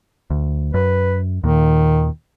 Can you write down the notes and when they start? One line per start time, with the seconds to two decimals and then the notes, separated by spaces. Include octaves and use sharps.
0.30 D2
0.74 F#2 B4
1.44 D#2 A#2 D#3